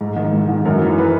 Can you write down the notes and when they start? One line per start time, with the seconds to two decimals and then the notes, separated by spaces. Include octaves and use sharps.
0.01 G#2
0.16 D#3
0.33 G#2
0.49 D#3
0.65 F#2 A#4
0.81 E3
0.98 B4